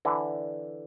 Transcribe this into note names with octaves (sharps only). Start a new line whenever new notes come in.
D3 E3